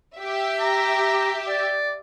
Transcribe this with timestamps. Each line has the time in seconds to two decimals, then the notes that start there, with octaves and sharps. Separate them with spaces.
0.18 G4 E5
0.60 A#5
1.48 D5